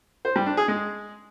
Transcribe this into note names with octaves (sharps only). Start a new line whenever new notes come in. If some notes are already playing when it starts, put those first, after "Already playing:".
C5
G3
D4
G#4
G#3